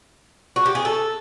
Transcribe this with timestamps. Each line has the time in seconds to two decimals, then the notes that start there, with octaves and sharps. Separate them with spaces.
0.56 F#4
0.66 G4
0.75 G#4
0.85 A4